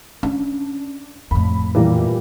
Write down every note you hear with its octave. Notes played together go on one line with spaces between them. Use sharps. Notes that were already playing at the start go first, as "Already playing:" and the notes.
C#4 D4
F2 A2 B5
A#2 E3 G3 A#3